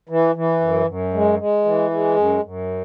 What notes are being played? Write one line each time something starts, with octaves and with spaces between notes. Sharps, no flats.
E3
E3
F#2
F#2
G#3
G#3
E3
G#3
F#2
F#2